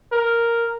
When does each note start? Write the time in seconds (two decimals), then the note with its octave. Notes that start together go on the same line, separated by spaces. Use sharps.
0.12 A#4